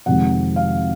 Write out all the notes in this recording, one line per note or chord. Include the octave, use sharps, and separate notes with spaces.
F2 C3 D#3 G#3 F#5
F5